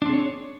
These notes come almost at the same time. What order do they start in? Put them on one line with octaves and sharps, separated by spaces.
D4 C4 G#4 C#5